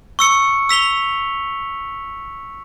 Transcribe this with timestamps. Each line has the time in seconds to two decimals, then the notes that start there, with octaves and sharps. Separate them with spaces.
0.19 C#6 E6 C#7
0.69 E6 B6 F7 G7